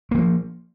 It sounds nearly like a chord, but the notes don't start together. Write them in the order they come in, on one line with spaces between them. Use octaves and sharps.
A#3 E3 F3